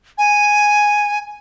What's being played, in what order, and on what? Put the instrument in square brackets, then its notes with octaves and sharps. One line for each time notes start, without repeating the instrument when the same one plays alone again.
[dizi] G#5